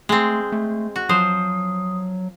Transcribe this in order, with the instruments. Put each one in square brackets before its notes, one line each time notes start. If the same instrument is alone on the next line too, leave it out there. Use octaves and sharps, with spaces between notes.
[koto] G#3 C4 [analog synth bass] A3
[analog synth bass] A3
[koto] F#4
[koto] F3 C5 [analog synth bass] F#3 [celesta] D#6